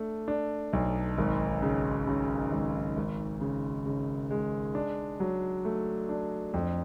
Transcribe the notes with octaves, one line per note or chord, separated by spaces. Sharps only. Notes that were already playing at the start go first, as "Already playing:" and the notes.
Already playing: A3 D4
D4
B1
G#1
C#3
C#3
G#1
G#1
C#3
C#3
G#3
D4
F#3
A3
D4
F2